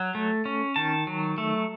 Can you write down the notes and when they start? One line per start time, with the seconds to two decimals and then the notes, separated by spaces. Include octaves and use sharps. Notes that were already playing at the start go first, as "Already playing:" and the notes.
Already playing: F#3
0.15 A3
0.45 C#4
0.76 D#3 A5
1.07 F#3
1.38 A3